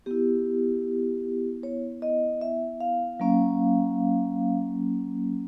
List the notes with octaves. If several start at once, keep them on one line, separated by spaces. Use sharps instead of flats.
B3 E4 G4
C#5
D#5
E5
F5
F#3 A#3 C#4